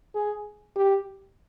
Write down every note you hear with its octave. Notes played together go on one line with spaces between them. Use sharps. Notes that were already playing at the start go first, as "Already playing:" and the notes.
G#4
G4